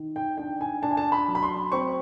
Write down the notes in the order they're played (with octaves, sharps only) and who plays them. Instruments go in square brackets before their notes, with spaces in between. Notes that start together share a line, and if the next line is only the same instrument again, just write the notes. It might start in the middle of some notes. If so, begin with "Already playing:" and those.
Already playing: [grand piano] D#3
G5
D4 G5
G#5
D4 A5
G#5
A5
B5
F#3
B5
C6
C4 C#6